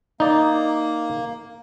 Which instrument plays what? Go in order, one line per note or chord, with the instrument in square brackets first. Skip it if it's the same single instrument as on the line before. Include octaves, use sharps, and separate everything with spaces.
[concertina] A#3 [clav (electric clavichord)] D#4 D5